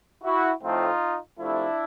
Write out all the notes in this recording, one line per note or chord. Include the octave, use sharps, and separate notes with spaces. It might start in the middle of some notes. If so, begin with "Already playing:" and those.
E4 F#4
A2 F3 A3 C4 D#4 F4
C3 F3 A3 D4 E4